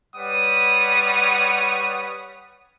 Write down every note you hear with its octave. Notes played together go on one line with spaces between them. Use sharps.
G3 B4 C#5 F#5 D#6